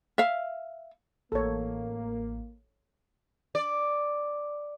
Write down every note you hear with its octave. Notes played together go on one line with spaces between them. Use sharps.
E5 F5
A1 A#3 A4 C#5
D5